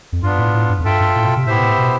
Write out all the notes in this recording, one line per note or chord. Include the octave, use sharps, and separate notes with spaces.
F2
G2 B3 D4 F4
A2
A2
G2
F2
G2 F4 A4 E5 G5
G2
A2
B2
C3
A2 B3 E4 G4 C5 E5
A2
B2